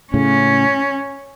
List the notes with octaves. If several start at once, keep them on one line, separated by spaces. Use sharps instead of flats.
A2 C#3 C#4